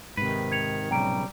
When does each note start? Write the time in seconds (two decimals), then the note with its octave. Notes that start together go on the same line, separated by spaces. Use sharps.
0.17 G#2 C3 D#3 B4
0.52 G#6 C#7 F7
0.91 B1 C#3 G3 G5 A#5 D7